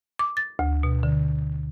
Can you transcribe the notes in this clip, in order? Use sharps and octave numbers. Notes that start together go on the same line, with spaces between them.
D6
A6
D2
B2
D3